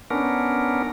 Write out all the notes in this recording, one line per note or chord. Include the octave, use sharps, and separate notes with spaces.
B3 C#4 D4 A#4